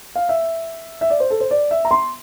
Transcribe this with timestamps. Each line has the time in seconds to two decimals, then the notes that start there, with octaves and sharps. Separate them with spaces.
0.16 F5
0.29 E5
1.01 E5
1.10 D5
1.20 C5
1.30 A4
1.40 C5
1.51 D5
1.71 E5
1.85 A#5
1.91 C6